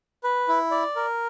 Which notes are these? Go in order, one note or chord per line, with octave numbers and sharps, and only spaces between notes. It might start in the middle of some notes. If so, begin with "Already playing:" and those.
B4
E4
D5
A#4